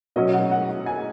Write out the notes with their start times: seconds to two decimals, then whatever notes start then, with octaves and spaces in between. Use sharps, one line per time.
0.16 B2 F#3 C#4 D#5
0.33 F#5
0.51 F#5
0.86 G#5